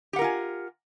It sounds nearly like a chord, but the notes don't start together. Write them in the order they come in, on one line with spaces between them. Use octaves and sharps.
G4 F#5 A#4 F4 G#5